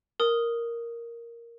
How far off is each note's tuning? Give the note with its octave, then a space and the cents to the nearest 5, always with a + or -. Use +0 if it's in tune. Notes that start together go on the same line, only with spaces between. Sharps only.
A#4 +0 D#6 +0